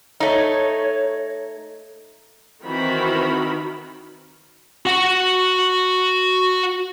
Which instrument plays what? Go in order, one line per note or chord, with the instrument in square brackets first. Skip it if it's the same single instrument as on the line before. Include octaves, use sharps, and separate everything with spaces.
[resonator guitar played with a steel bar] A3 D#4 [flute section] C#5
[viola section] D#3 E3 C4 F#4 A#4 B5
[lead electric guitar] F#4 F#5